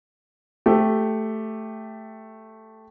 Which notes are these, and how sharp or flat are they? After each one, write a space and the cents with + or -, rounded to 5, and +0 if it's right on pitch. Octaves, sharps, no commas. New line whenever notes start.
A3 +0 G4 +0